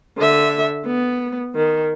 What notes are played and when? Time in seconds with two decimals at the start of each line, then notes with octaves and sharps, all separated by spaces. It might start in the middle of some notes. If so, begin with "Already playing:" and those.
0.18 D3 E5
0.86 B3
1.56 D#3